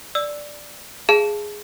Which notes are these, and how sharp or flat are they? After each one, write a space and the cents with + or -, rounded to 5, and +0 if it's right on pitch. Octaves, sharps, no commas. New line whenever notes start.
D5 +0 E6 +0
G#4 +0 F5 -25 A5 -5